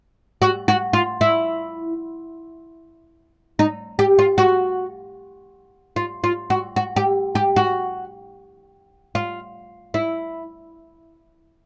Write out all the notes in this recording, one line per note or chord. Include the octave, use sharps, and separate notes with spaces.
F#4
F#4
F4
E4
D#4
G4
F4
F#4
F4
F4
F#4
F#4
G4
G4
F#4
F4
E4